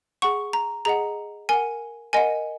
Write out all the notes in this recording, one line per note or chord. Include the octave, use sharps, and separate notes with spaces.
G#4 F#5 C#6
A#5
G#4 D#5 F#5 A#5
A#4 F#5 G#5
A#4 D#5 F#5 G#5